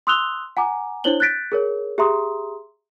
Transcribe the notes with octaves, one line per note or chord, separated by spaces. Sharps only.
C6 D#6 E6 F#6 F7 G7
F#5 G#5 A#5 D6
D4 E4 C5 C#5 F#7 G7
F#6 G6 A6 B6 D7
G#4 A#4 C#5
G4 G#4 E5 A#5 C6 D#6